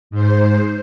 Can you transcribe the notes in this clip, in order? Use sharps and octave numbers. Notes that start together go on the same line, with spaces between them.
G#2 C5